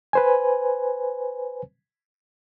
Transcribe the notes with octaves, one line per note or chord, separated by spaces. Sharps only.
B4 C5 G#5